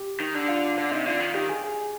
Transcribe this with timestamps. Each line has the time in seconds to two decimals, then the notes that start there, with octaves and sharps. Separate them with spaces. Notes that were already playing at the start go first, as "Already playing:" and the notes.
Already playing: G4
0.20 D#3
0.34 D3
0.48 F4
0.77 D3 D4
0.91 C3 D#4
1.06 D3 F4
1.20 D#3
1.34 D#3 G4
1.49 G#4
1.64 G#4